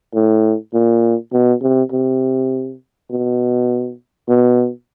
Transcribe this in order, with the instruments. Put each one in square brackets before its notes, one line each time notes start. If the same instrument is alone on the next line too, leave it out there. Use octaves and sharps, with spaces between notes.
[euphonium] A2
A#2
B2
C3
C3
B2
B2